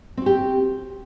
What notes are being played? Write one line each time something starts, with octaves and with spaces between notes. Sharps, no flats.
C4 F#4 G4